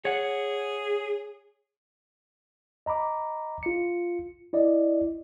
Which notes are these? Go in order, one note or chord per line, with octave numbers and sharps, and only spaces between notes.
G#4 C#5 F#5
D#5 A#5 B5 D6
F4 C#7
E4 D5 D#5